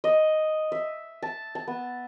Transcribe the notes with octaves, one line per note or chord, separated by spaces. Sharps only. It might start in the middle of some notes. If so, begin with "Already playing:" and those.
D#5
E5
A5
A5
B3